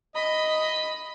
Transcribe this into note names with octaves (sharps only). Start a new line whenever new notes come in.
D#5 B5